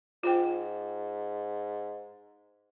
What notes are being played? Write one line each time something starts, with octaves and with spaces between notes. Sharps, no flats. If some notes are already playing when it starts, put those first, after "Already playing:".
G#2 F4 C5 G5